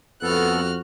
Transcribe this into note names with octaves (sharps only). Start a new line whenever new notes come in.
F2 B3 F#4 A4 F6 F#6